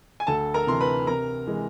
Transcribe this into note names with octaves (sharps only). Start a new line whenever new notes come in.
G#5
D2 A4 A5
A#4 A#5
C3 E3 C6
B4 B5
C3 A#4 A#5
E3 G#3